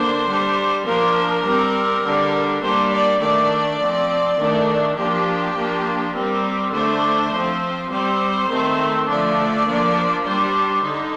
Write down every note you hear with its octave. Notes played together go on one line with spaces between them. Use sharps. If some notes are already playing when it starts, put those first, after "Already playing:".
Already playing: D3 A#3 D4 C5
G3 D4
F3 A#3 D4 A#4
G3 C4
D3 G3 D4
G3 A#3 D4 C5
D5
D#3 A3 D4 D5
F3 C4
D#3 A3 D4
F3 A#3 D4 G4
F3 A#3 D4
G3 C4 A#4
D3 A3 D4 C5
F3
C4
G3 C4 C5
D#3 A3 C4
D3 F3 A3 D4 D5
F3 A#3 D4
G3 D4 C5
D3 D#4